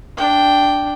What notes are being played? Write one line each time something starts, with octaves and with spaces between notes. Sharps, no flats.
D4 G5